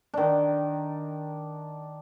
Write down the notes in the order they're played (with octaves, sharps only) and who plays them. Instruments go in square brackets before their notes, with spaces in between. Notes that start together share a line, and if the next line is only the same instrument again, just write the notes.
[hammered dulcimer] D#3 D4